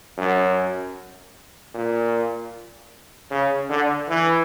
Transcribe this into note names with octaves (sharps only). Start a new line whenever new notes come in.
F#2
A#2
C#3
D3
E3